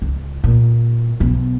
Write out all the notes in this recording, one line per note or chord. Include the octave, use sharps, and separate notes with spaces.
C#2
A#2
B1 B2